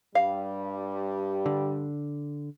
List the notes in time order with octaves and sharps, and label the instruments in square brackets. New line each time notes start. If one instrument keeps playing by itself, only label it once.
[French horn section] G2 G3 [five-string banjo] F5
[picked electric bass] D3